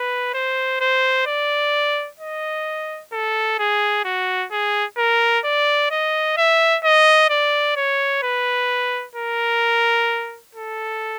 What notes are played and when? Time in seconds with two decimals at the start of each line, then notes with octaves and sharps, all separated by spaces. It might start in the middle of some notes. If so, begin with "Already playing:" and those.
Already playing: B4
0.34 C5
0.80 C5
1.26 D5
2.20 D#5
3.13 A4
3.59 G#4
4.05 F#4
4.52 G#4
4.98 A#4
5.44 D5
5.91 D#5
6.37 E5
6.84 D#5
7.30 D5
7.76 C#5
8.23 B4
9.16 A#4
10.55 A4